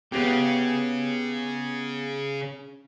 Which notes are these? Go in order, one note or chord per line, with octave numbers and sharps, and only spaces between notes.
C#3 B3 G4